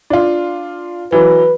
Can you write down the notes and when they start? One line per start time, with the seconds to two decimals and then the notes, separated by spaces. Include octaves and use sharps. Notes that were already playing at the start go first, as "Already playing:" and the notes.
0.10 D4 F4
1.12 E3 F#3 B4